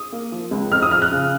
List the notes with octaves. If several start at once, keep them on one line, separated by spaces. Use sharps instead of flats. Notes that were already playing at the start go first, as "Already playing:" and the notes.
Already playing: D#6
A#3
F3
C#2
F2 F6
D#6
F3 F6
F#6
C#3